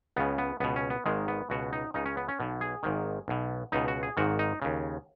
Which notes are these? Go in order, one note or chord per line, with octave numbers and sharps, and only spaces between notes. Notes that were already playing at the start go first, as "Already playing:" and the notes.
C#2 C#3 B3
B3
C#2 B2 B3
C#4
B3
G#1 G#2 D#3 G#3
B3
C#2 B2 F#4
D#4
C#2 C#3 D#4
C#4
B3
C#4
B1 B2
G#4
G#1 G#2 D#3
B1 B2
C#2 B2 D#4
F#4
G#4
G#1 G#2 D#3 F#4
D#4
D#2 C#3